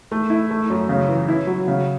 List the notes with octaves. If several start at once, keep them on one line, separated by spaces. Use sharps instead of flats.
A3
E4
A3
F#2
C#3
E3
E4
F#3
C#3